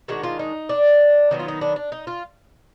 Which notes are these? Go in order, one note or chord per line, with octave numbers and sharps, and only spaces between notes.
D#3 G#3 D4 F#4
F4
D#4
D4
D#3 F#3 B3 D#4
F4
D#4
D4
D4
D#4
F4